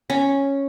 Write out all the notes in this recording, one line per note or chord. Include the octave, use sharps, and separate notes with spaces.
C#4